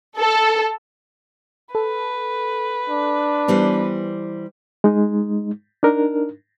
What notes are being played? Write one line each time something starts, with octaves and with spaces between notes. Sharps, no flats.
A4
A4 B4
D4
E3 G3 B3 C5
G#3 D#4
D4 D#4 A#4